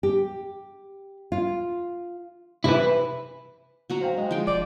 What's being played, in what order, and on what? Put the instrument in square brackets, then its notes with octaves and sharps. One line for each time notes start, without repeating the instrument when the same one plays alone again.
[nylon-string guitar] G4
F4
[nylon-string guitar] C3 E5 [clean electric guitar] E4 B4
[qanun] F#3 F#4 A#5
[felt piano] C5 F5 G5
[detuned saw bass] G#3 [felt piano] D#5
[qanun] F3 G5
[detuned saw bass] E1 [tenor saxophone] D5